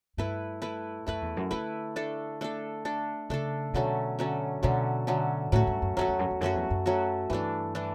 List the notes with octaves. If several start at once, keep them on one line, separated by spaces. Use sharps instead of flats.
G2 A3 E4 B4
A3 E4 B4
F#2 A3 E4 B4
E2
F#2
D3 A3 E4 B4
A3 D4 A4
A3 D4 A4
A3 D4 A4
C#3 A3 D4 A4
B2 D3 F#3 A3 C#4
D3 F#3 A3 C#4
B2 D3 F#3 A3 C#4
D3 F#3 A3 C#4
A2 F#3 A3 C#4 F#4
G2
F#2
F#2 F#3 A3 C#4 F#4
E2
F#2
E2
F#2 F#3 A3 C#4 F#4
E2
F#2
F#3 A3 C#4 F#4
G2 E3 A3 D4
E3 A3 D4